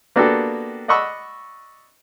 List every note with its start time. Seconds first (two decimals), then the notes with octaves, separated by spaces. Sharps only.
0.16 A#3 B3 D4 F#4 G4 A4
0.88 D5 D#5 F#5 B5 C#6 E6